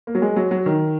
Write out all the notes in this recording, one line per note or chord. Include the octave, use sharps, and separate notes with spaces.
A#3
F#3
G#3
F#3
F#3
D#3